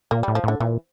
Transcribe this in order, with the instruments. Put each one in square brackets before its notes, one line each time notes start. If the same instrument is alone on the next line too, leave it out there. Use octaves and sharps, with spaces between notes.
[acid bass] A#2 [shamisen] A#3
[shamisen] G3
[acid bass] A2
[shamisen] F3
[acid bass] A2 [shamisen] D3
[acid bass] A#2 [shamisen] E3